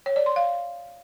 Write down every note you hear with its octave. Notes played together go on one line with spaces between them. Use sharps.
C#5
D5
C6
F5